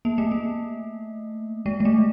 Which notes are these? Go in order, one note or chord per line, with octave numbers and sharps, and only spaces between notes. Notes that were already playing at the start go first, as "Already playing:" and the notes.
A#3
A3
A#3
G#3
G#3
A3